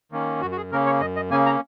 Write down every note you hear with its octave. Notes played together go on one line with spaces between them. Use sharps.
D#3 A#3 C#4
F#2 F#4
F#4
G#4
C#3 A#3 C#4 A#4
C#5
F#2 D#5
D#5
C#3 A#3 C#4 G#5
A#5